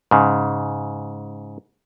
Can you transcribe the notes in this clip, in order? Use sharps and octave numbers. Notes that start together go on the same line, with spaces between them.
G#2 C#3